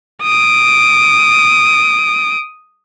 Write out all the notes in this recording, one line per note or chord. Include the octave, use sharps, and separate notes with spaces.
D#6 D7